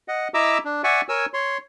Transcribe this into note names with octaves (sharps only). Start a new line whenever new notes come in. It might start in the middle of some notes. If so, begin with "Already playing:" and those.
D#5 F#5
E4 D#5 E5 A#5 D6 E6
D4
D5 E5 F#5 G#5 C#6
A#4 C#5 G#5 E6
C#5 C6